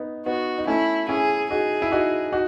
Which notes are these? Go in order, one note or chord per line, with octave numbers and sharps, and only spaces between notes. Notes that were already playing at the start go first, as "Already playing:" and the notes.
Already playing: B3 D#4
B3 D#4 F#4
D#4
A3 C#4 E4
C#4 E4 G#4
D#4 F#4 G#4
E4
D#4 F#4
D#4 F#4